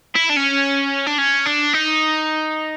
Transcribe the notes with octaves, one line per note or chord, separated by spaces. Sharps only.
E4
D4
C#4
D4
C#4
D4
D#4